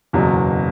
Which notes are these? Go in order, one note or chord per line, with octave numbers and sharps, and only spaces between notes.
F#1 E2 B2 F#3